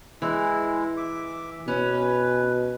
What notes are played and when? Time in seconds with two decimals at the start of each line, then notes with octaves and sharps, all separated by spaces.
0.22 E3 G#3 E4
0.97 E5 D6
1.68 B2 C#4 B4